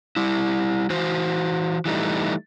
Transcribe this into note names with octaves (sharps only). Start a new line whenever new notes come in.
G3 E4
E3 F#4 C5
E3 G3 A3 D#4